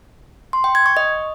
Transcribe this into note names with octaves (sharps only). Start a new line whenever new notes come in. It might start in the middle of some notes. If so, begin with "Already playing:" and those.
C6
G5
G#6
C#6
D#5